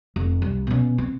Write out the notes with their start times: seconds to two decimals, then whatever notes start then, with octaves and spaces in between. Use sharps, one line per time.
0.16 F1
0.42 C2
0.67 B2 C#4
0.98 C4